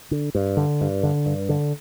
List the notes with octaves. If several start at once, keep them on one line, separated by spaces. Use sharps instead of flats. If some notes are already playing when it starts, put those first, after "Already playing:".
D3
G2
D3
G2
D3
G2
D3